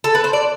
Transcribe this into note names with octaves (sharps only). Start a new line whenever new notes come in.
A4
B4
C5
D5